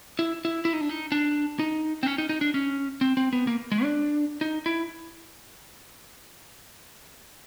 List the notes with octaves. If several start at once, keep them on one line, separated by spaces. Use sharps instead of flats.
E4
E4
E4
D#4
D4
D#4
D4
D#4
C4
C#4
D#4
D#4
D4
C#4
C4
C4
B3
A#3
G#3
D4
D#4
E4